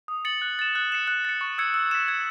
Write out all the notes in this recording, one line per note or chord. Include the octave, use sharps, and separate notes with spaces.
D#6
A6 C#7 F#7
F#6
A6 E7
F#6
C#7 E7
F#6
A6 C#7
C#6
E6 G#6 C#7
E6
B6 E7
G#6